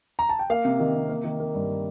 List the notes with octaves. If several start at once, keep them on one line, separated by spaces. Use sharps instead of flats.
A#5
A5
G5
A#3 F5
C3
D#3
C3
A#3
D#3
A#3
G2